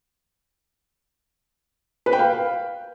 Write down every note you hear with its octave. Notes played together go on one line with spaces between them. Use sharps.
B4
G5
F5